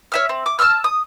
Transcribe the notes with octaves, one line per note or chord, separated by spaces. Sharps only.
C#5 E5 F6
C4
D6
A5 C#6 E6 F6
D#6